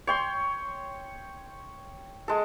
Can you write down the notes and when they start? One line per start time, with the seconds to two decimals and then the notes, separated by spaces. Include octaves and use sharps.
0.07 C#5 G5 C6
2.28 G#3 A4